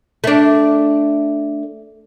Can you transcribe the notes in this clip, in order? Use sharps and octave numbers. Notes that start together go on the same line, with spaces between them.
A3 D4